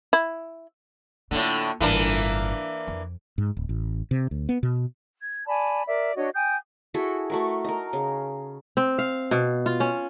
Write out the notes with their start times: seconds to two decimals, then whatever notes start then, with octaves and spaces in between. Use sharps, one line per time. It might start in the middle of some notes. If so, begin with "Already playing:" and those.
0.13 E4
1.31 A2 D3 A#3 F4
1.80 G1 A2 E3 A#3 D4
2.87 F2
3.38 G#2
3.57 D1
3.69 A1
4.11 C3
4.31 D2
4.49 B3
4.63 B2
5.20 G#6
5.47 D5 G#5 A5 B5
5.87 A#4 D5 E5
6.15 D4 F#4 C#5 D#5
6.33 G5 G#5 D#6 G6
6.94 E4 F#4 G#4 A4
7.30 A3 F#4 A#4
7.64 D#4 A#4
7.93 C#3
8.77 C4
8.98 F5
9.31 B2
9.66 F4
9.80 C#4